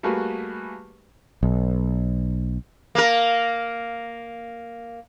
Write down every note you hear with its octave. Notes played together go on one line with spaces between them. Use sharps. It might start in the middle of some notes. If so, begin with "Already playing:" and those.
G3 A3 A#3 F#4 G#4 B4
B1
A#3 A#4